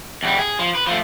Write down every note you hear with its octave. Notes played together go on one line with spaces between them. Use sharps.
E2 G3
G#4
F3
B4
F3 A3